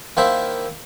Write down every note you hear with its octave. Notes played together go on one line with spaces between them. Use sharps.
D#3 A#3 E4 C5 E5 A5